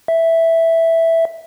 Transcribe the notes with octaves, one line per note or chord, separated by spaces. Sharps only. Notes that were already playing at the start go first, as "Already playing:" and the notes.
E5